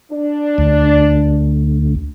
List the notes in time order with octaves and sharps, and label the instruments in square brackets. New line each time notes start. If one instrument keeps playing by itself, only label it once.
[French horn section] D4
[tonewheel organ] D2